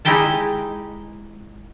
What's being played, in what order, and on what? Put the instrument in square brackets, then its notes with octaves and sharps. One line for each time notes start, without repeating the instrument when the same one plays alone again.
[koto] G#3 D#4 E4 G4 G5 A5